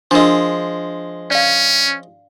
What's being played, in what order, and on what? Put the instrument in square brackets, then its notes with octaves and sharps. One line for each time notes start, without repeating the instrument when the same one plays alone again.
[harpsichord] F3 G#3 [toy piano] D4 A#4
[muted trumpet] C#4 [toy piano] D5 F5